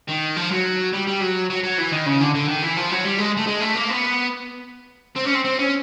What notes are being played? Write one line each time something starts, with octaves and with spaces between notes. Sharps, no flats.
D#3
F3
F#3
G3
G3
F#3
F#3
F#3
E3
D#3
C#3
D3
D3
D#3
E3
F3
F#3
G3
G#3
A3
G#3
A3
A#3
B3
C4
C#4
C4
C4
C#4